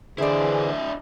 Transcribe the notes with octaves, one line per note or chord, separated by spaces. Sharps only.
D3 E3 D4 E4 G#4 C5 D5